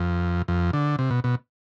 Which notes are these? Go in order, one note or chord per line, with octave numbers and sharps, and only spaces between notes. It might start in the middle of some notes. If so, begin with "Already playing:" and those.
Already playing: F2
F2
D3
C3
B2
B2